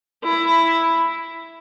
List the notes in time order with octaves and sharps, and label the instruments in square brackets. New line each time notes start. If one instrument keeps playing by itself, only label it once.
[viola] E4